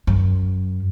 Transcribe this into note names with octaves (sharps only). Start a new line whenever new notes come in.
F#2